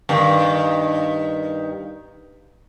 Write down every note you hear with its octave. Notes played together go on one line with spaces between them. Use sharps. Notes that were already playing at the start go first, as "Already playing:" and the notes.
G2 D#3